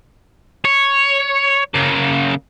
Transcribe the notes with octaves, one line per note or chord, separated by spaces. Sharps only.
C#5
C#3 A#3